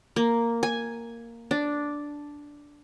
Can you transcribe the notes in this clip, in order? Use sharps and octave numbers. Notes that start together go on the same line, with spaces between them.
A#3
G#5
D4